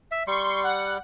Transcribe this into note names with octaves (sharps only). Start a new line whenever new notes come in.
E5
G3 C6 C#6
F#5